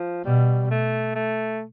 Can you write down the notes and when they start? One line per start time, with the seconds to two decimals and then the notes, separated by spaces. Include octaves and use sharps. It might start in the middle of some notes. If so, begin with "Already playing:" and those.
Already playing: F3
0.25 B2 G3
0.71 A3
1.15 A3